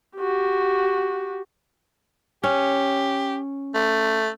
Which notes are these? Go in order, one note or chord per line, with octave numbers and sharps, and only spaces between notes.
F#4 G4
C#4 G4
A3